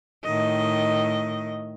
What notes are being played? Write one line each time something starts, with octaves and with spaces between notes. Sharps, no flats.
A2 D#3 D#5